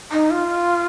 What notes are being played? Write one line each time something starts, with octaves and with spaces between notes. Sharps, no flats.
D#4
F4